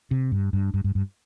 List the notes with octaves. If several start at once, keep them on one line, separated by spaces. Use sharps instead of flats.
C3
G2
G2
G2
G2
G2